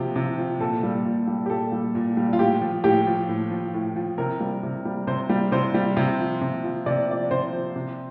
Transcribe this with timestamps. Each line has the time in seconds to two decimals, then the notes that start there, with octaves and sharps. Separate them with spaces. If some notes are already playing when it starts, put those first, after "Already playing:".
Already playing: C3 F3 G4
0.16 C3
0.38 F3
0.60 A#2 A4
0.83 G3
1.05 A#2
1.27 G3
1.46 G4
1.50 A#2 A4
1.72 G3
1.95 A#2
2.17 G3
2.33 F4
2.39 A2 G4
2.61 F3
2.84 A2 G4
3.07 F3
3.28 A2
3.51 F3
3.74 A2
3.96 F3
4.18 C3 A#4
4.40 G3
4.63 C3
4.85 G3
5.07 C3 C5
5.29 G3
5.52 C3 C5
5.74 G3
5.97 C3
6.19 F3
6.42 C3
6.64 F3
6.86 C3 D5
7.08 F3 D5
7.31 C3 C5
7.53 F3
7.76 C3